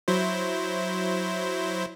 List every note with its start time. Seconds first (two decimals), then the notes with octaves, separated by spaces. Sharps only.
0.08 F#3 E4 C5